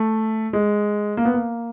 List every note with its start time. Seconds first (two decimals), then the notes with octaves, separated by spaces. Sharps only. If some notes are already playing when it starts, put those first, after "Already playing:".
Already playing: A3
0.53 G#3
1.17 A#3
1.25 B3
1.34 A#3